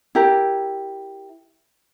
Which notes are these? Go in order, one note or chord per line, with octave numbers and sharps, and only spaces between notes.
E4 G4 A#4